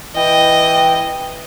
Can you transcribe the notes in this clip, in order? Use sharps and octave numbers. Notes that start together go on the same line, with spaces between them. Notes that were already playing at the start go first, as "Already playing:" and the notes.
E3 D#5 G5